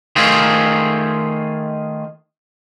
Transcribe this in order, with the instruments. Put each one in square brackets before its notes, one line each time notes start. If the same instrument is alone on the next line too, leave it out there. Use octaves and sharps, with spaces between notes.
[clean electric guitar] D#3 A3 F4 G#4 C5